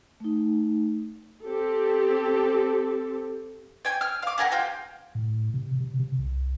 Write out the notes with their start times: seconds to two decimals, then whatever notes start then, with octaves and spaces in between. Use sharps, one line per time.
0.20 A3 D#4
1.45 C4 G4 A4
3.85 G5 G#5
4.01 F6
4.22 F5 D6
4.38 G4 G#4 A#4 F#5
4.51 F4 G4 G5
5.15 A2
5.54 C3
5.80 C3
5.99 C3
6.19 C2